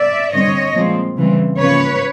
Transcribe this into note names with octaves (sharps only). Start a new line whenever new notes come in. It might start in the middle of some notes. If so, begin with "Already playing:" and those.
Already playing: D5 E5
G2 D3 G3 C4 C#5 D#5
A#2 F3 G#3 C4
C#3 E3 G3 C4
C#3 F3 A#3 C#4 B4 C#5